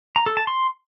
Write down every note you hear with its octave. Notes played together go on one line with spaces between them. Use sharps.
A#5
A4
A5
C6